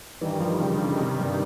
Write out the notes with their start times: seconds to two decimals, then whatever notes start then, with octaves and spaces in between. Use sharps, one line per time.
0.21 G2 D#3 E3 G3
0.40 F3
0.61 C#3
0.74 D3
0.87 C#3
1.00 C3
1.20 G2